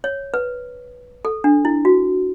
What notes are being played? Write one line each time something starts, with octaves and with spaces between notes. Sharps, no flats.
C#5
B4
A4
D4
E4
F#4